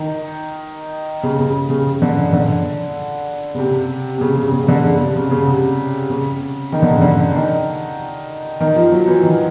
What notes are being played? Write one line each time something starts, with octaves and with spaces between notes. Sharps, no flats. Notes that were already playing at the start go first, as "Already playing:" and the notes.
Already playing: D#3
C#3
C#3
C#3
D3
D3
C#3
C3
C3
C#3
C#3
C#3
D3
C#3
C3
C#3
C#3
C3
C#3
D#3
D3
C#3
D3
D#3
D#3
F3
F#3
E3
D#3